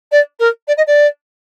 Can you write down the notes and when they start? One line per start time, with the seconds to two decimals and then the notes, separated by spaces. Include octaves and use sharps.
0.11 D5
0.39 A#4
0.67 D5
0.77 D#5
0.86 D5